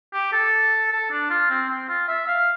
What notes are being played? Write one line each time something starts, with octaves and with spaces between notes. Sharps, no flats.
G4
A4
A4
D4
F4
C4
C4
F4
E5
F5